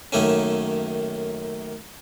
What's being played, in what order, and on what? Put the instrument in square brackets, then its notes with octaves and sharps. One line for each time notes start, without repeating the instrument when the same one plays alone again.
[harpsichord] F#2 D#3 A3 A#3 C#4